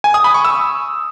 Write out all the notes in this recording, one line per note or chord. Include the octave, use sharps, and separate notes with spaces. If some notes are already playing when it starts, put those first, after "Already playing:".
G#5
D#6
B5
C#6
E6